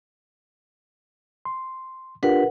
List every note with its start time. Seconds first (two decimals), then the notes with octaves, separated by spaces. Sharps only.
1.45 C6
2.23 D4 F4 G4 A#4 B4 F#5